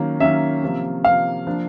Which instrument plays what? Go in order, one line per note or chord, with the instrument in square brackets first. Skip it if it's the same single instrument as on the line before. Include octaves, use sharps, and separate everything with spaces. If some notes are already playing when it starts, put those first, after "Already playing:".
Already playing: [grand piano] D#3 F#3 A#3 C#4
[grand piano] D#3 F#3 A#3 C#4 [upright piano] E5
[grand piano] C3 F3 A#3
[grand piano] C3 F3 A#3 [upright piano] F5
[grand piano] F3 A#3 D4